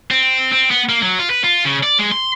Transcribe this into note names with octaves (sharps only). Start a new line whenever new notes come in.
C4
C4
B3
A#3
F#3
F4
B4
F4
C#3
D5
G#3
C6